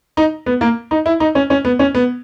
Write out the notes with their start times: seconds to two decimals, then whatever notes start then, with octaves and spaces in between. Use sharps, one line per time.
0.17 D#4
0.46 B3
0.61 A#3
0.91 D#4
1.06 E4
1.20 D#4
1.35 C#4
1.50 C#4
1.65 B3
1.79 C#4
1.95 B3